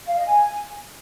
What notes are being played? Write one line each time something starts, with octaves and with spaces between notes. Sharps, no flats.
F5
D#5
G#5